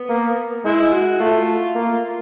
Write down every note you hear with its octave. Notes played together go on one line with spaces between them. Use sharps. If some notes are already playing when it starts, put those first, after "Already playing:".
Already playing: B3
A#3
G#3 E4
F#4
A3 F4
A#3